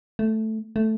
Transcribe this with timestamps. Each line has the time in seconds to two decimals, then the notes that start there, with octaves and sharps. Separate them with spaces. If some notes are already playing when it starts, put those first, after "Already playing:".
0.19 A3
0.76 A3